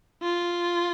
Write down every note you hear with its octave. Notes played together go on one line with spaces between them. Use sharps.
F4